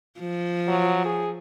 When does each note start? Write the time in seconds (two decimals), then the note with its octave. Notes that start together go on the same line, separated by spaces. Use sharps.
0.19 F3
0.68 F#3
1.05 G#4